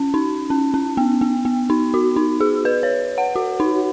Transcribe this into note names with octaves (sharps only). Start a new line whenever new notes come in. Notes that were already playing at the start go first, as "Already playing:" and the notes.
Already playing: C#4
D#4
C#4
C#4
B3
B3
B3
D#4
F#4
D#4
G#4
B4
C#5
F#5
F#4
D#4